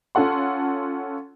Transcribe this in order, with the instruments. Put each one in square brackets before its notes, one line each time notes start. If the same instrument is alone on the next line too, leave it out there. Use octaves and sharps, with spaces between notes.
[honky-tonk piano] C#4 F4 A4 F#5 C6